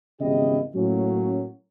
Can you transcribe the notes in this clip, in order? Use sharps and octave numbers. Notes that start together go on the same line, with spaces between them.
G#1 E2 C#3 E4 G4 D#5
A2 F#3 A#3 C#4